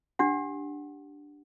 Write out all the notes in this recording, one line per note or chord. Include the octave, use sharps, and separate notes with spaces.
D4 G4 F#5